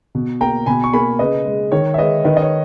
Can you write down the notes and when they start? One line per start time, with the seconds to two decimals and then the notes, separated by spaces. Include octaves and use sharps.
0.15 B2
0.41 A#3 G5 A#5
0.66 B2 G#5 B5
0.84 C#6
0.93 A#3 G#5 B5
1.19 C#3 B4 D#5
1.45 G#3
1.72 D#3 C#5
1.94 E5
1.98 G#3 B4 D#5
2.24 D#3 B4 D#5
2.37 D#5
2.42 C#5